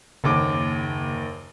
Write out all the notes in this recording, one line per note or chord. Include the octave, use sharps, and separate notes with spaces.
F#1 D#2 C#3 D6